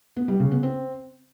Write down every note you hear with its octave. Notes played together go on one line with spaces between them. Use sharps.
B3
G3
C#3
B3
C4